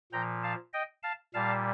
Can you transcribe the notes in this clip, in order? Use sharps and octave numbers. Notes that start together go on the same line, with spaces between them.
A#2 F3 G5 A#5
F5 A5
D#5 G5
F5 A5
A#2 G3 F5 A5